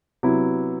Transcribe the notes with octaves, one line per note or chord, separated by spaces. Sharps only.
C3 F#3 B3 E4